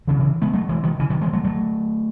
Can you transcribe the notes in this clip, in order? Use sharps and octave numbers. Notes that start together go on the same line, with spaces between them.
C#3 E3
C#3 E3
G#3 B3
F#3 A3
E3 G#3
D#3 F#3
C#3 E3
D#3 F#3
E3 G#3
F#3 A3
F#3 A3